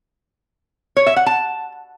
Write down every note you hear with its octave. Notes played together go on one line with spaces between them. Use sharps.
C#5
E5
F#5
A5